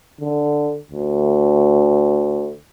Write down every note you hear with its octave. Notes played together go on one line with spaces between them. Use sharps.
D3
D2